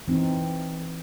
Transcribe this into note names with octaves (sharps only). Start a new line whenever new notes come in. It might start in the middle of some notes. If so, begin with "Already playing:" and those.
E3 C4 D#4